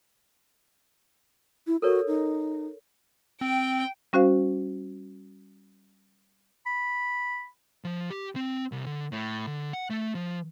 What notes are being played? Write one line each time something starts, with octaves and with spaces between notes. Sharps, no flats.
E4
F#4 A4 A#4 C#5
D#4
C4 G5
G3 C#4 F#4 C5 F5
B5
F3
G4
C4
C2
D3
A2
D3
F#5
A3
F3